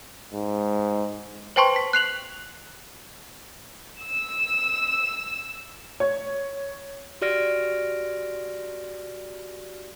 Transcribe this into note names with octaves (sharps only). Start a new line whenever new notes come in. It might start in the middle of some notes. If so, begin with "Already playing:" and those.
G#2
B4 C5 G5 A5 C6 C#6
B6
F#6 C7 F7 F#7
E6 E7
C#5
F#4 G4 D5 F6 A#6 D7